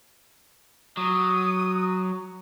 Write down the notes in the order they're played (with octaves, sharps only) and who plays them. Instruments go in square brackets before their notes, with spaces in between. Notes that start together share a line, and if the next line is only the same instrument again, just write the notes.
[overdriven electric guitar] F#3 [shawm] D#6